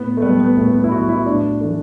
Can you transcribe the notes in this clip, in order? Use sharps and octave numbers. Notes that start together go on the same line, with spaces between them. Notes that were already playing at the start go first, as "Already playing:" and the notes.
Already playing: A2 B3
A3
G3 B3
B3
A2 A3
B3
E4
G3 F#4
E4
A2 D4
E3 A3